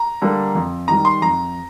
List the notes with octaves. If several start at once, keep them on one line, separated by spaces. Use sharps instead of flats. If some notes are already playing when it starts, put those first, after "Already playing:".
Already playing: A#5
D3 G3 A#3
F2
D#3 G3 A#5
C6
F2 A#5